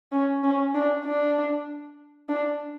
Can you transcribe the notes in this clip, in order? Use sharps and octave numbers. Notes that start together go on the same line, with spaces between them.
C#4
C#4
D4
D4
D4